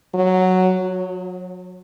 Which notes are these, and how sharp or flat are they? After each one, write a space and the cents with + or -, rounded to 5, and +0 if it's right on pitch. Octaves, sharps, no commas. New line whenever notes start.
F#3 +0
F#3 -35